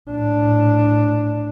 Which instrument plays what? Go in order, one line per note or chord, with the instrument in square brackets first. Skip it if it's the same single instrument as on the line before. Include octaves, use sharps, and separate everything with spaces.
[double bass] A2 D4